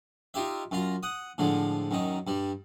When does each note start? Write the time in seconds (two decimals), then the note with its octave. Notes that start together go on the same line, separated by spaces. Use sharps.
0.34 D#4 F4 G4 E5
0.71 F#2 F4 A#5
1.03 F#5 D#6
1.38 A2 D3 F3 G#3
1.91 F#2 D#3 D#4
2.27 G2 G3